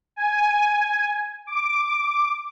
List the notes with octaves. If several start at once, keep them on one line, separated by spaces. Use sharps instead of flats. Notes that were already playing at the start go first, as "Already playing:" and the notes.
G#5
D6